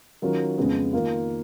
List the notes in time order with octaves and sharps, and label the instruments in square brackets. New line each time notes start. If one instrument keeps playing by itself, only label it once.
[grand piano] D#3 F#3 C#4 F4 A#4
F2 C#3 G#3 B3
D#3 A#3 F4